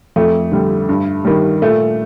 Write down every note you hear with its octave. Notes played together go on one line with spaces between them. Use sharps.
F2 A3
D3 G3
G2
D#3 G3
A#2 A3